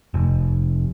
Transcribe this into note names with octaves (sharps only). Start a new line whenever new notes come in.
F1